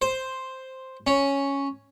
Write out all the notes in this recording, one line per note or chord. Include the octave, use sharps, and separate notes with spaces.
C5
C#4